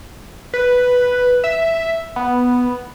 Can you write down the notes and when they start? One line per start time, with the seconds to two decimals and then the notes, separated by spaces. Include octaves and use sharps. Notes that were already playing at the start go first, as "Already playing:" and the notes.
0.54 B4
1.44 E5
2.16 B3